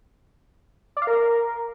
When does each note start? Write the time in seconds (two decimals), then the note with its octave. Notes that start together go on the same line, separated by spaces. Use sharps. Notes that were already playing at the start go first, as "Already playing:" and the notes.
0.97 D5
1.02 F5
1.07 A#4